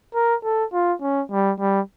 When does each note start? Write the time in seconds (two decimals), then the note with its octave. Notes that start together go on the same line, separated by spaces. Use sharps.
0.15 A#4
0.44 A4
0.73 F4
1.02 C#4
1.32 G3
1.60 G3